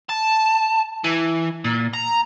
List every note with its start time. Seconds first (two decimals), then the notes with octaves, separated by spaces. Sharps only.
0.09 A5
1.04 E3
1.64 A#2
1.93 A#5